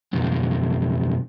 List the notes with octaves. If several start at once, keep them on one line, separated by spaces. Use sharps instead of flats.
B1 F2